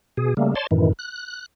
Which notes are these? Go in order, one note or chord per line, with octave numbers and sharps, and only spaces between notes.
B2 G#4
C#3 G3 A3 A#3
C#5 D5 A5 C6
F#2 A2 D#3 E3
F#6